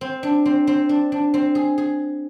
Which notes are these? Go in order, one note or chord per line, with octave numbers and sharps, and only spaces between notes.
C4
D4
C4
C4
D4
D4
C4
G#4
G#4